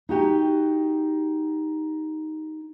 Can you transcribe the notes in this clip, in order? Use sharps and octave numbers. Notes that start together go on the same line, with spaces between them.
D#4 F#4 G4